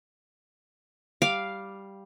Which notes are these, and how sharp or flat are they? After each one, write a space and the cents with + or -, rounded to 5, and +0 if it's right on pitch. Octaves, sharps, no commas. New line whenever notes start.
G3 +0 F5 +0 D6 +0